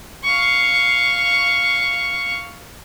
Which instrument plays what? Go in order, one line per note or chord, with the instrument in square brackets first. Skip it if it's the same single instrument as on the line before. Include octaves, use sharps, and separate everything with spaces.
[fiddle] F5 C#6